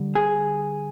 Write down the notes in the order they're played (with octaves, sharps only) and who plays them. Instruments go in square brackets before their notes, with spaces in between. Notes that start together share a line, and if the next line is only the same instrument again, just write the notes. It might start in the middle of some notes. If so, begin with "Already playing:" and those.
Already playing: [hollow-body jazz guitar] D3 G3
G#4